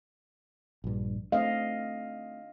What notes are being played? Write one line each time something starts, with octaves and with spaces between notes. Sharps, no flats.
A#1 G2
A3 C4 D4 D#5 F5